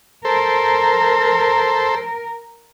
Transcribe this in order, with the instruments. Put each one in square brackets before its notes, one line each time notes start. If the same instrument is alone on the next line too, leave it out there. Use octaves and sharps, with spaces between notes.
[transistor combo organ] A4 C5 [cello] A#4